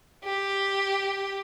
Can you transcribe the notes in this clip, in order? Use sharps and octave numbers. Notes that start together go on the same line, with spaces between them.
G4